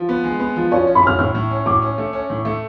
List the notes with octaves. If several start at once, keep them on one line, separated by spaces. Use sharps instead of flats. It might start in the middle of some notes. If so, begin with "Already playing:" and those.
Already playing: F3
B3
G#3
B3
F3
C#4 C#5
C#4
B5
C#4 F6
A2 F6
A2
C#4
A2 D6
C#4
A3
C#4
A2
A3